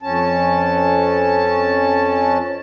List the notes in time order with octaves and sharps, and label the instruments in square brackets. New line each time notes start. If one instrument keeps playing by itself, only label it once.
[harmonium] F2 C#4 A5